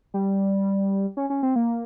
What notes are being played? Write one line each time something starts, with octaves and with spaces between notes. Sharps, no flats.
G3
C#4
C#4
C4
A#3